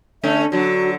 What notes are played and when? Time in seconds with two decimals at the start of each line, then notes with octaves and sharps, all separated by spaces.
0.23 D3 A3 C#4 E5
0.52 D3 F#3 F#4